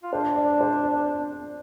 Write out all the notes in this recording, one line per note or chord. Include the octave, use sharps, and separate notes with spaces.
F4
D4 C5
D5
C5
D5